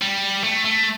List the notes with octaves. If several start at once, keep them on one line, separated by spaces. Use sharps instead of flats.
G3
A3
A3